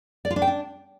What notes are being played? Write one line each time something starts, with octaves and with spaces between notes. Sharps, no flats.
D5
F4
D4
G5
D4